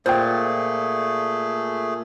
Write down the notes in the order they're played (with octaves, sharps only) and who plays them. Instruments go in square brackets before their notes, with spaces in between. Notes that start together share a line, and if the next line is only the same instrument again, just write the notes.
[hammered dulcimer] A#2 [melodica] A3 G#4 [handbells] C5 G5